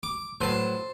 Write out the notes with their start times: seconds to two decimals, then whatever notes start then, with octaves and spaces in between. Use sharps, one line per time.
0.03 D6
0.41 A2 F#3 B4 C5 A5